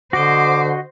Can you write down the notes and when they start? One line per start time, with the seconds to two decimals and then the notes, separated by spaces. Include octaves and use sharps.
0.13 D3 F#4 C5 D#5 D6